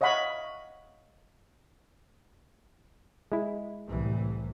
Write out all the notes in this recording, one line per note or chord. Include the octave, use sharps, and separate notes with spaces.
C#5 D#5 F5 F#5 B5 C#6
G#3 E4
C2 A2 E3